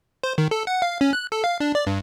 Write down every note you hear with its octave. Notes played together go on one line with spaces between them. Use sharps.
C5
D#3
A4
F#5
F5
C#4
F#6
A4
F5
D4
D5
G2